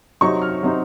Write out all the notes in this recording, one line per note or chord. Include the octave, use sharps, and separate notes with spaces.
C3 F#3 C4 D#4 C#6
F6
C3 F#3 C4 D#4